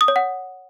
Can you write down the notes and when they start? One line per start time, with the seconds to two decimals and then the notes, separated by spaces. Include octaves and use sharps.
0.01 D#6
0.08 C#5
0.16 F#5